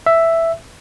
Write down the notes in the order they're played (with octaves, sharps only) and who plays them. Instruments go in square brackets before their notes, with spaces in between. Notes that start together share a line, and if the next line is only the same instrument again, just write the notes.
[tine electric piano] E5